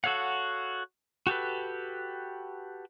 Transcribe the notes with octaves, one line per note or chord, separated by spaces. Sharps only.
F#4 A4 C#5 F5 F#5
F#4 G4 A4 B4